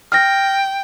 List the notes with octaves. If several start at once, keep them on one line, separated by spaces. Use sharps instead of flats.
G5 F6 A#6